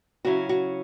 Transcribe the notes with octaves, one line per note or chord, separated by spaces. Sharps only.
C#3 F#3 C#4 E4 F#4
F#4